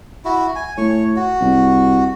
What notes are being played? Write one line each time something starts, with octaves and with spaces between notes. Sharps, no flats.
E4 F#4
G#5
A2 C#5
F#4
C2